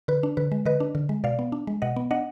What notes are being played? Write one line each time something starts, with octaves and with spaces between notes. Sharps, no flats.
D3 B4
D4
D3 B4
G#3
D3 B4 D#5
D4
D3
G#3
B2 D5 F5
B3
D4
G#3
B2 D#5 F#5
B3
D4 D#5 F#5